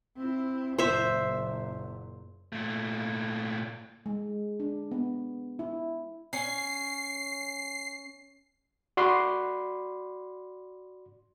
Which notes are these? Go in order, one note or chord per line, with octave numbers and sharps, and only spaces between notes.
C4 E4
F#1 A#2 C5 E5
A#2 A3
G#3
D4
B3
E4
C#4 C7
F#4 D5 B5 C6